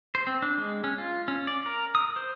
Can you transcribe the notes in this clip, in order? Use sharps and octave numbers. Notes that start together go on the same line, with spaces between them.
C5
C4
D4
G#3
C#4
F4
C#4
D5
A#4
D#6
C5